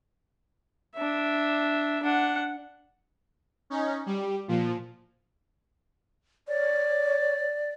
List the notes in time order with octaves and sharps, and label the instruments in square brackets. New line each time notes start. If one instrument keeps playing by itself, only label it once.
[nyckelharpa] D4 E5
D4 F#5
[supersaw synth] C#4 D#4
G3
A#2 F3
[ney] C#5 [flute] D5